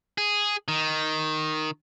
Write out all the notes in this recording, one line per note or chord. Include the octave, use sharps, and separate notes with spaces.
G#4
D#3